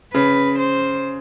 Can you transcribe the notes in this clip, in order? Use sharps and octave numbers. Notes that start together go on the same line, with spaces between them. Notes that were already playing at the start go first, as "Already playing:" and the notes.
C#3 B4
C5